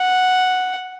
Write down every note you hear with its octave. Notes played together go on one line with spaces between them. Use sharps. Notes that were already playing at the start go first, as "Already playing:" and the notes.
Already playing: F#5